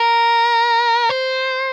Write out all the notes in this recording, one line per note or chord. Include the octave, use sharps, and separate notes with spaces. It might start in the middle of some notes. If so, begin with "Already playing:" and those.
Already playing: A#4
C5